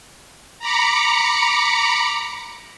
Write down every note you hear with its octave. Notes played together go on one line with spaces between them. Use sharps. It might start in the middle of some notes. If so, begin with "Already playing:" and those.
A#5 B5 D6 C#7